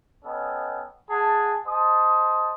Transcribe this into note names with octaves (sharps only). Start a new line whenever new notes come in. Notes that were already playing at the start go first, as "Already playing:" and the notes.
B3 C#4 A4 D#5 G5
G#4 F#5 A5
C5 D#5 A5 D#6